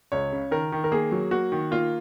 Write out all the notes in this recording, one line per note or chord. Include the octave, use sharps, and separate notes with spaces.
C#2 C#5
C#3
D#3 A#4
D#3
A#4
A#3 G#4
F#3
A#3 F#4
D#3
A#3 F4